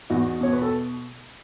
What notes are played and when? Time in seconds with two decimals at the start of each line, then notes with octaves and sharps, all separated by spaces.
0.10 E2 D#4 F#4
0.41 B2 C#5
0.52 B4
0.62 A4